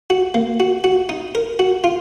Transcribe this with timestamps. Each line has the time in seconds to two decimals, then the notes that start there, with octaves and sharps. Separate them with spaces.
0.10 F#4
0.34 A#3
0.60 F#4
0.84 F#4
1.09 D#4
1.35 A#4
1.59 F#4
1.84 F4